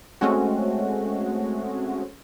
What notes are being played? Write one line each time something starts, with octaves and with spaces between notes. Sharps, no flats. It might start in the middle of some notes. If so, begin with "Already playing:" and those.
G#3 A3 C4 C#4 F#4